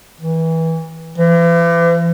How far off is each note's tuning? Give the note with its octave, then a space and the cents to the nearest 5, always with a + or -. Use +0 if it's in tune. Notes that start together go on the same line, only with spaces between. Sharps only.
E3 -20
E3 +45